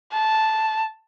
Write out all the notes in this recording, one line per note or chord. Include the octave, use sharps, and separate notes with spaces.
A5